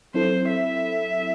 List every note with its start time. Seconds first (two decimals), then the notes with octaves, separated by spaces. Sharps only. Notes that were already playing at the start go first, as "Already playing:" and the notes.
0.14 F#3 C4 E4 A4 C5
0.49 E5